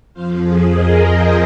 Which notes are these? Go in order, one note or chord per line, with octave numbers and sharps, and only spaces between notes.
F2 F3 C5 F5
G#4
A#4 D#5
G#4 C5